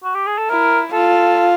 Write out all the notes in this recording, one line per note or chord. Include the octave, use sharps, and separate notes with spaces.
F#4
G4
G#4
A4
E4 A#4
F4 A4